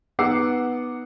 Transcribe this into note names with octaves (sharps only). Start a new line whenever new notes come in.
B3 D#4 F#5 D6 E6 C7